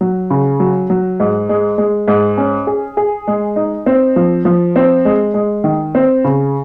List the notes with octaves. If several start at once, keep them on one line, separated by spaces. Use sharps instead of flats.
F#3
C#3
F#3
F#3
G#2
G#3
G#3
G#2
C#4
G#4
G#4
G#3
D#4
C4
F3
F3
C4
G#3
G#3
D#3
C4
C#3